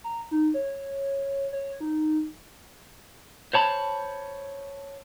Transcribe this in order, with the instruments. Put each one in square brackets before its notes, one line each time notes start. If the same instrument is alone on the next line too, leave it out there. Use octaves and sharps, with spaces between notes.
[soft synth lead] A#5
D#4
C#5
C#5
D#4
[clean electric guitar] C5 C#5 A5 B5